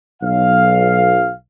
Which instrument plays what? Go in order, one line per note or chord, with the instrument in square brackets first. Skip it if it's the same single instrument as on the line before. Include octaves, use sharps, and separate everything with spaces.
[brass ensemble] B1 F5